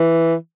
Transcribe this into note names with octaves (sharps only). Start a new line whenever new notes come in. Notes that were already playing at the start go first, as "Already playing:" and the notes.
Already playing: E3